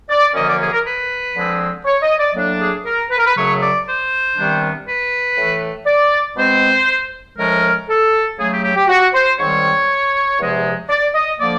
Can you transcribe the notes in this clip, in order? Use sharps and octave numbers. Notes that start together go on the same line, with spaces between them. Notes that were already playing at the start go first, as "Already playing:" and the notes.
D5
F#2 D3 F3 A#3 C#4 D#5
D5
G#4
A#4
B4
D3 F3 G#3 C4
C#5
D#5
D5
A2 F#3 A#3 D4
G#4
A#4
B4
A#4
B4
F#2 C#3 F#3 A3 C#5
D5
C5
C3 D#3 G3 B3 D4
B4
A2 E3 A3
D5
B2 G#3 C4 C5
A2 F3 G#3 C#4 A#4
A4
C#3 F#3 A3 G#4
G4
G4
G4
F#4
C5
G#2 D#3 G3 C4 C#5
E2 C3 F3 G#3
D5
D#5
D3 F3 A#3 D5